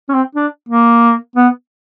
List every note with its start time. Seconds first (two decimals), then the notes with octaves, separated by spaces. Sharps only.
0.09 C#4
0.14 C4
0.35 D4
0.69 A#3
1.36 B3